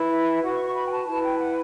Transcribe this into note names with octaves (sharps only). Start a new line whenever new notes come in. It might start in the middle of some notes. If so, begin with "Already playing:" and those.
Already playing: E4 B4
E5
F#4 B4 F#5
C#6
C#6
B5
G5
A5
E4 B4 A5
G5
F#5